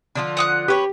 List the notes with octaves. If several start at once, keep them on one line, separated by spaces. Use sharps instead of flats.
D3 F3 F4
F#5 D#6 F#6
G4 B4 C#5